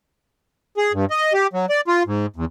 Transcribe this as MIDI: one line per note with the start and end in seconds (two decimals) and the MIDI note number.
0.77 0.92 68
0.93 1.05 43
1.10 1.33 75
1.33 1.47 67
1.53 1.66 54
1.69 1.81 74
1.88 2.03 65
2.07 2.26 44
2.36 2.45 40